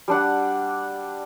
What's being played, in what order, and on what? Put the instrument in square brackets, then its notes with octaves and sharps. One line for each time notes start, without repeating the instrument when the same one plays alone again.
[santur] G3 D4 F#5